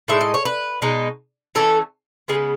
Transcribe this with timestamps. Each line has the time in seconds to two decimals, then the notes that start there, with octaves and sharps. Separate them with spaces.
0.08 A2 G#3 D#4 E5
0.21 D#5
0.34 C#5
0.45 B4
0.82 B2 G#3 D#4
1.55 E3 A3 C#4 A4
2.28 C#3 G#3 B3 G#4